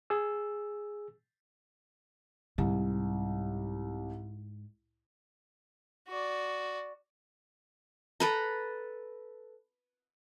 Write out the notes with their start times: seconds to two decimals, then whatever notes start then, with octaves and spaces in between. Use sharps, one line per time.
0.10 G#4 E6
2.58 C2 G#2
6.08 F#4 D5
8.20 A4 B4 A#5